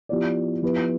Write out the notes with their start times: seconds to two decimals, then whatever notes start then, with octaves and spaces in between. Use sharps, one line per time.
0.09 F3 B3 E4 G4 D5
0.62 F3 B3 E4 G4 B4